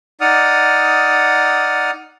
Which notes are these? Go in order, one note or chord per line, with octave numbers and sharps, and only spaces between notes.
D#4 D5 F#5 D#6 F6